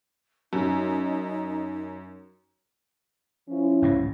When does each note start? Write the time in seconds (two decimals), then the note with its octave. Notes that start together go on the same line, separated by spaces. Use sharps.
0.53 F#2 D#4
3.49 F3 C#4 E4
3.82 G#1 C#2 A2